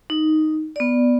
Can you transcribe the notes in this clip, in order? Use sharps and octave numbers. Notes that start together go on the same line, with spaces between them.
D#4
B3 D5